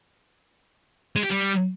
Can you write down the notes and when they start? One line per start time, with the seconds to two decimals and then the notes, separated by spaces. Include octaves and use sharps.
1.16 G#3
1.23 G4
1.31 G3